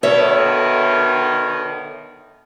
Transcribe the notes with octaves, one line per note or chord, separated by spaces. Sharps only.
B2 D3 D#3 A4 C#5 E5